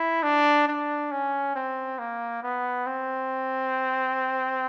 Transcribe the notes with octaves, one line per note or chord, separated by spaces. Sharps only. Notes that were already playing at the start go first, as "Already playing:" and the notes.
Already playing: E4
D4
D4
C#4
C4
A#3
B3
C4